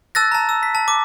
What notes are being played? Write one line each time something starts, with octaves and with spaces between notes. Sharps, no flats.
A5 E6 F#6 A6 A#6
A5 A#5
E6
B6
A5
D6